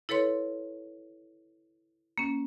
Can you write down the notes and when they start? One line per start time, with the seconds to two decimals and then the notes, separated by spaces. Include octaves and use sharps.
0.09 E4 A4 B4 C#5 C6
2.18 A#3 C#4